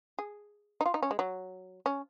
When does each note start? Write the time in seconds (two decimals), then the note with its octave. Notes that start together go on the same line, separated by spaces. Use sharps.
0.19 G#4
0.81 D#4
0.86 F4
0.94 D#4
1.02 C#4
1.11 G#3
1.19 F#3
1.86 C#4